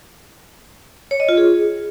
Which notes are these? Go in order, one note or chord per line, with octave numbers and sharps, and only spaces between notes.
C#5
D#5
F4
G#4